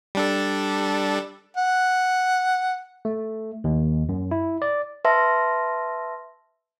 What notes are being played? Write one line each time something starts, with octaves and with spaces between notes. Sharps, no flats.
G3 D4 A4
F#5
A3
D#2
F#2
E4
D5
B4 E5 A5 C6 E6 A#6